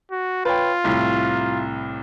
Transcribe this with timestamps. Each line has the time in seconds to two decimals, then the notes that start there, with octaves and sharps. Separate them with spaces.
0.11 F#4
0.45 F4 B4 C#5 G5
0.84 C2 A2